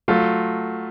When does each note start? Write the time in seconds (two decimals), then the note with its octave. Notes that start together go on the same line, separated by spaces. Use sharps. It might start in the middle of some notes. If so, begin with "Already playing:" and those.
0.08 F#3 A3 F4